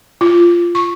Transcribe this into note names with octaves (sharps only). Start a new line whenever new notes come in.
F4
C#6